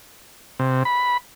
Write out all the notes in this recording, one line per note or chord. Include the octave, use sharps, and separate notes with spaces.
C3
B5